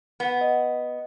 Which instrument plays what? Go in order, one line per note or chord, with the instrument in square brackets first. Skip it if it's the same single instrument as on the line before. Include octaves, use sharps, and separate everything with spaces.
[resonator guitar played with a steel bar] B3
[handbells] D#5